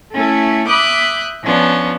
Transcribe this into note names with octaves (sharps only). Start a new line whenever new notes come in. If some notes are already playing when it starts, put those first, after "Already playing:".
A3 C#4 E4 A4
E5 B5 D6 D#6 F#6 G6
F3 B3 C#4 D4